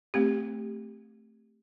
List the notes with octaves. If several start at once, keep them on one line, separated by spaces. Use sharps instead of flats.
A3 C4 G4